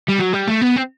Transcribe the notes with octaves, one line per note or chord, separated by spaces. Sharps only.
G3
F#3
G3
A3
B3
C4